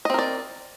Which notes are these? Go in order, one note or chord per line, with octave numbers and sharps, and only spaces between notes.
C4 A#4 D5 D#5